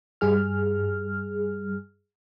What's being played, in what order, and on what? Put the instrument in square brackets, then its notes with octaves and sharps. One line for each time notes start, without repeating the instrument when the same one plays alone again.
[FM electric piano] G2 G3 G#4 F6